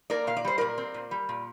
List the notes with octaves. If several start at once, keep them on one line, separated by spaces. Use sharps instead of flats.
A#3 A#4 D5
A#2 F5
D5
G3 C5
A#2 A#4 D5
C4
A#2
G3
A#2